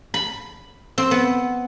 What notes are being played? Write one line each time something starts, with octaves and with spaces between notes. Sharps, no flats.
B5
C4
B3